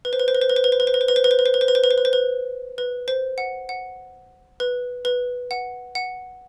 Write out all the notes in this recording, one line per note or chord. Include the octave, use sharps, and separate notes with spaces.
B4
C5
B4
C5
B4
C5
B4
C5
B4
C5
B4
C5
B4
C5
B4
C5
B4
C5
B4
C5
B4
C5
B4
C5
B4
C5
B4
C5
B4
B4
C5
F#5
F#5
B4
B4
F#5
F#5